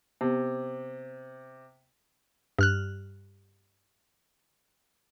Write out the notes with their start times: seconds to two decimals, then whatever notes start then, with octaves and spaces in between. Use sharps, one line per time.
0.21 C3 B3
2.59 G2 F6 F#6